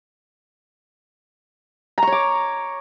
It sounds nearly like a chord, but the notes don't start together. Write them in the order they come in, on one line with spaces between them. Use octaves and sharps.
A#5 C#6 C#5 D6